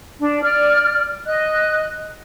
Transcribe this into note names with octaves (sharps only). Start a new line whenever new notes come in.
D4
D5 F6
D#5 F#6